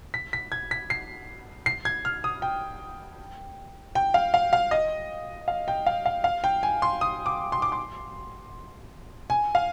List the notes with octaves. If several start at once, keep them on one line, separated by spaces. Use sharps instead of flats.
B6
B6
G#6
B6
C7
C7
G#6
F6
D#6
G5
G5
F5
F5
F5
D#5
F5
G5
F5
F5
F5
G5
G#5
C6
D#6
D6
C6
D6
C6
G#5
F5